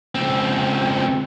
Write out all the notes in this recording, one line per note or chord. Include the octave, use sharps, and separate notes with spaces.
C#2 C4